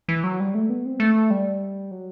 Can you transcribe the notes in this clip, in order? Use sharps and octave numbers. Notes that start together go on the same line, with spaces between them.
E3
F#3
G3
A3
B3
C4
A3
G3
F#3